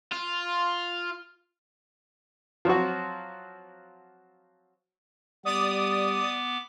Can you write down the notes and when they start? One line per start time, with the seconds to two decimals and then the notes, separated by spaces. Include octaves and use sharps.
0.12 F4
2.65 F3 F#3 C4 F#4
5.45 G3 B3 D5 D6 D#6